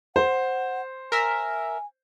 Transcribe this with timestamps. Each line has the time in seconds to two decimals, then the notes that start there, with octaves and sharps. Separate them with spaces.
0.16 C5 F#5
1.12 A#4 E5 G#5